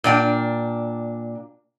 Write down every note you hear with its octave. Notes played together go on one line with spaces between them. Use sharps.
A#2 D4 G5